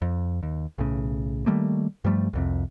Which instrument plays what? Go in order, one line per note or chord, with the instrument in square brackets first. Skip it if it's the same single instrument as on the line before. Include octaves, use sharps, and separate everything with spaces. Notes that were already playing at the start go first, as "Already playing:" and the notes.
[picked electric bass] F2
D#2
B1 A2 C#3
D#3 G3 A3 A#3
G2 F3 G3 A3
C2 F2 C3